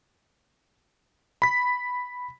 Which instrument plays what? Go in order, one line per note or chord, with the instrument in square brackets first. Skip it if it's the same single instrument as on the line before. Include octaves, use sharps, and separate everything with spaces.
[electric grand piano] B5 B6